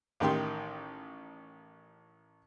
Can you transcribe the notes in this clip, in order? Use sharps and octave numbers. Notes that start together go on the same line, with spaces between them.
A1 D#3 G4 C6